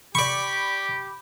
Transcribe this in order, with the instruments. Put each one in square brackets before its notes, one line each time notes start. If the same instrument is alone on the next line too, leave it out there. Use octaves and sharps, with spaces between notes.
[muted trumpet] G4 [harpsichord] D5 C#6 [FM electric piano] B5 D6